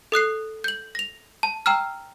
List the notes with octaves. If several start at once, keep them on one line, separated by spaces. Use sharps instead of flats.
A4 D#6 F#6 C7
G6 F#7
A#6 F7
A5
G5 A#5 E6 F6